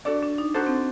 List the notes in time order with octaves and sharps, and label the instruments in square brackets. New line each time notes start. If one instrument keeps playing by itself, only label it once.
[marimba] D4 [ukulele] F#4 A4 D5
[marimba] D4
D#4
[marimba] D4 [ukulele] D#4 F#4 A4 C5
[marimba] C4